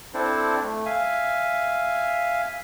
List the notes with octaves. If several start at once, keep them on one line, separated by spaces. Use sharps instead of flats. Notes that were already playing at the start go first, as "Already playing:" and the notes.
C4 D4 E4 A4 C5
A3
E5 F5 G#5